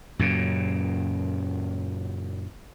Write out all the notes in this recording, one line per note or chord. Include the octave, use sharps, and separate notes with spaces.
F#2 A#2 C#3